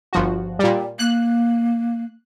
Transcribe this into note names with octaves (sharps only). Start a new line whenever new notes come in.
G1 F3 F#4
A#2 G3
A#3 F#6